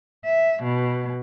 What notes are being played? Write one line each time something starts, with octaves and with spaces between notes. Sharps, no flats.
E5
B2